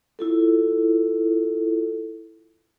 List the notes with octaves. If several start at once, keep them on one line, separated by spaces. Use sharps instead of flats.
E4 F4 A4